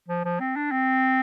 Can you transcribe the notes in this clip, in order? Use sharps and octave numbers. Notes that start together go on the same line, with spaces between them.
F3
F3
C4
D4
C4